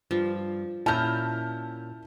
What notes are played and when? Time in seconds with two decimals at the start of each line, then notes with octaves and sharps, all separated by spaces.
0.11 G2 F3 G3
0.86 A#2 C#4 E4 A5 A#5 F6 G6